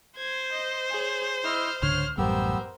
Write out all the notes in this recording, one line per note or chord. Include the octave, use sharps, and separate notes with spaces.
C5 G#6
D#5
G#4 C#5
E4 D#5 F6 G6
C#2 G#2 D3 C#5 C6 F6
A1 F#2 G3 B3 G4 A#4 C5 E6